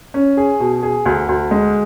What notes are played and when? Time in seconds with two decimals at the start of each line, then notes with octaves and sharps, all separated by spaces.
0.14 C#4
0.37 G#4
0.60 B2
0.83 G#4
1.06 D2
1.29 D2
1.51 G#3